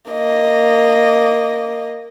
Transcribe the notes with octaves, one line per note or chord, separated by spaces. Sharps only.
A#3 D#5